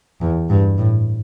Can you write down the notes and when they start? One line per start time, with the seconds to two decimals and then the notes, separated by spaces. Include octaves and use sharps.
0.21 E2
0.50 G2
0.78 A2